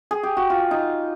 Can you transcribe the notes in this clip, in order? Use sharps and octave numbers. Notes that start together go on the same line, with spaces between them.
G#4
G4
F#4
F4
D#4